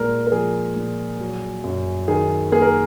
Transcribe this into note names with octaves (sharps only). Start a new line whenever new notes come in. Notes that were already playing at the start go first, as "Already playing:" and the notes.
Already playing: A#2 G#3 A#4
A#4
F3 G#4
A#2
F#3
F#2
D#3 G#4
A#3 G#4
A#4